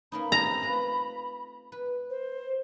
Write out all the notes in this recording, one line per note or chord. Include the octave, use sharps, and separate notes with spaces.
A#3 C#4 D#4 B5
A3 C4 A#5
F4 B4
B4
C5